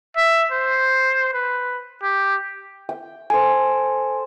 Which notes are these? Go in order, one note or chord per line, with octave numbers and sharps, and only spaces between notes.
E5
C5
B4
G4
G5
A4 C5 G#5